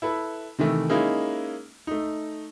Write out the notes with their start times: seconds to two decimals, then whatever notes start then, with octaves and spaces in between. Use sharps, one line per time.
0.02 E4 A4 B4
0.59 C3 D#3 E3 A3
0.89 G#3 A#3 C#4 D#4 E4
1.87 A3 D#4